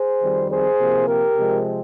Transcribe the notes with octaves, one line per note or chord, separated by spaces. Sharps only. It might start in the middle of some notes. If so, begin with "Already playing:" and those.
Already playing: G#4 C5
F2 D#3 G3 C4
G#4 C5
C3 F3 A#3
G4 A#4
C3 F3 G#3 C4